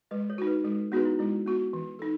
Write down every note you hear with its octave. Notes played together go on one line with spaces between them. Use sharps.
G#3 B4 D#5
A4 C#5
D#4 F#4
B4
G#3 A4
B3 D#4 F#4 G#4 B4
E4
G#3 E4
B3 F#4
E3
D#4 A4